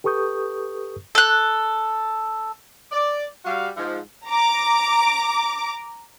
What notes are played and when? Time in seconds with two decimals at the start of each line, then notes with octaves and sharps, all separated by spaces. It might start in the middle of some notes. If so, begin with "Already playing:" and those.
0.04 G4 A4 B4 C#6 D#6 G6
1.15 A4 F#6
2.92 D5
3.45 G3 F#4 F5
3.77 G#2 F3
4.28 A#5 D6